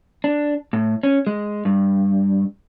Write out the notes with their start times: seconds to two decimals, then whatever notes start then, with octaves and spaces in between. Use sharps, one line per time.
0.24 D4
0.73 A2
1.03 C#4
1.27 G#3
1.65 G2